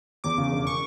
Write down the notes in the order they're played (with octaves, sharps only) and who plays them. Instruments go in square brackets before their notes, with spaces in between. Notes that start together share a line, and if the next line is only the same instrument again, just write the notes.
[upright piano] E2 [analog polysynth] D6
[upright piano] C#3
E1
[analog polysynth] C#6